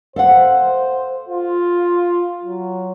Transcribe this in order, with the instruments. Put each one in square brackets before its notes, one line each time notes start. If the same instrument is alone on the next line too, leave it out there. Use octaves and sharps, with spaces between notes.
[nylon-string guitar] A4 F5 F#5 [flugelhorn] C5
[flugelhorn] F4
F#3